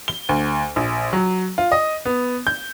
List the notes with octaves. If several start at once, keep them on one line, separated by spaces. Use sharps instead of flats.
G7
D2
A#1
F#3
F4
D#5
B3
G6